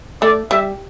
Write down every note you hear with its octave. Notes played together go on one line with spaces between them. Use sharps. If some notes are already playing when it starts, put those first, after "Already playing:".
A3 D5
G3 E5